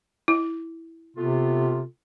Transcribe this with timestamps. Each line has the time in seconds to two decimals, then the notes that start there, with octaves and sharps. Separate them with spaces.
0.28 E4
1.17 C3 A3 B3 F4